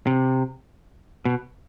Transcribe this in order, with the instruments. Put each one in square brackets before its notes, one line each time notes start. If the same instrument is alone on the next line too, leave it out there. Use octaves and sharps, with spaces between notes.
[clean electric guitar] C3
B2